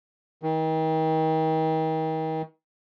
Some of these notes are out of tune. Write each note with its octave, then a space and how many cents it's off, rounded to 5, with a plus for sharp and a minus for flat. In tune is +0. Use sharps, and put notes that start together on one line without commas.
D#3 +35